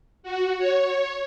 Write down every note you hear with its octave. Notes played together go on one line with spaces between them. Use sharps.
F#4
C#5